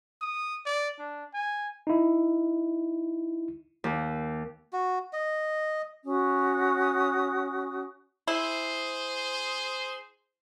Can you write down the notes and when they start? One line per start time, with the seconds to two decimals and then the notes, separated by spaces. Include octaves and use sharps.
0.21 D#6
0.66 D5
0.99 D4
1.34 G#5
1.87 D#4 E4
3.84 D#2
4.73 F#4
5.13 D#5
6.05 C#4 F#4 D#6
8.28 E4 G#4 C5